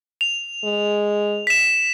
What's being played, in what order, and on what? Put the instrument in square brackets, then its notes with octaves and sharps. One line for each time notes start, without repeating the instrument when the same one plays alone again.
[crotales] F7
[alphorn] G#3
[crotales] B6 E7